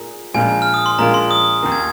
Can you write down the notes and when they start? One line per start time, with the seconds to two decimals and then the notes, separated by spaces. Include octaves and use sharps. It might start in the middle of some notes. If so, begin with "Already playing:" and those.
Already playing: A#2 A#3 G#4
0.34 A#1 A#2 G#3 F4 A#4 G#5
0.62 F6
0.74 D#6
0.86 C6
0.98 A#1 A#2 G#3 F4 A#4 A#5
1.14 C6
1.31 D#6
1.62 D#2 D#3 A#3
1.72 G#6